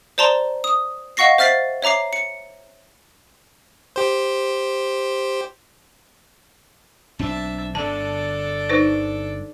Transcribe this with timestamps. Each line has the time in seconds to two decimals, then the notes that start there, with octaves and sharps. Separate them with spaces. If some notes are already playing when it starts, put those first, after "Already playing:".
0.18 C5 D5 A5 A#5 C6
0.64 D#6
1.17 D#5 F5 F#5 C#6 A#6 C7
1.38 C5 E5 F6 A6 B6 C7
1.82 C#5 E5 A#5 D6 C7
2.13 C#7
3.96 G4 C5
7.19 B1 C4 D4 E5 A5
7.75 G1 D3 D4 A4 A5
8.69 D#4 B4 C5